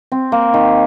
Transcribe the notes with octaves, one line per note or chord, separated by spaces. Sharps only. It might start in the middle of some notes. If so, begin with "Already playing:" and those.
C4
A#3
D#3